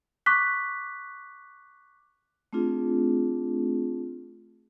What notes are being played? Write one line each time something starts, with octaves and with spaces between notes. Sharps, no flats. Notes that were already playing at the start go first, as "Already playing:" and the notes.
C#6 D6 F#6 B6
A3 C4 D4 F4 G#4